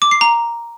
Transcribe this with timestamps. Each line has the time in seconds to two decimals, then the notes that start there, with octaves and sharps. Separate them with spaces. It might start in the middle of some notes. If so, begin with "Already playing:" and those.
0.02 D6
0.11 C7
0.21 A#5